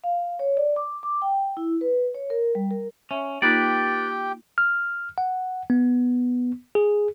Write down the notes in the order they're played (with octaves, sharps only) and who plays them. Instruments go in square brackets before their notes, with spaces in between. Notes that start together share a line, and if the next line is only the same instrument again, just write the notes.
[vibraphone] F5
C#5
D5
D6
D6
G5
E4
B4
C#5
A#4
G3
A#4
[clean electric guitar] C#4 [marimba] E5
[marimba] A#3 D#4 F4 [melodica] G4 G5 [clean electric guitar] B4 D5
[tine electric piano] F6
F#5
B3
G#4